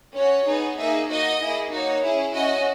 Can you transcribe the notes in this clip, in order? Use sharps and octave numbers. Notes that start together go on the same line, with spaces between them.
C#4 F#4 C#5
B3 D#4 G#4
A#3 D#4 G#4 E5
A#3 D#4 F#4 D#5
A#3 E4 G#4
A#3 D#4 F#4 C#5
C#4 E4 G#4
C#4 F#4 D#5